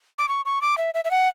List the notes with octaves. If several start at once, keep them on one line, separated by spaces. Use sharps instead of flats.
D6
C#6
C#6
D6
E5
E5
E5
F#5